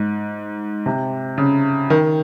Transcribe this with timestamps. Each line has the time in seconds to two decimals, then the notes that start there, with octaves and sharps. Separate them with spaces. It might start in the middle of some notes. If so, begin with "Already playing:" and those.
Already playing: G#2
0.86 C3
1.38 C#3
1.90 D#3